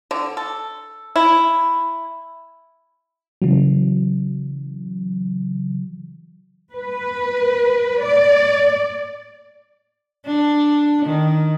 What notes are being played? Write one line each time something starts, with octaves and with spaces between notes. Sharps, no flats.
D3
A4
E4
C#3 E3 F#3
B4
D5
D4
D#3